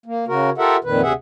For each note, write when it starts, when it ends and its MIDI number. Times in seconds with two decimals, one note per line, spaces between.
0.06 0.25 58
0.28 0.50 49
0.28 0.50 66
0.28 0.50 70
0.58 0.77 65
0.58 0.77 67
0.58 0.77 69
0.58 0.77 70
0.58 0.77 76
0.58 0.77 78
0.84 1.01 41
0.84 1.01 46
0.84 1.01 51
0.84 1.01 71
1.02 1.13 38
1.02 1.13 48
1.02 1.13 68
1.02 1.13 76
1.02 1.13 78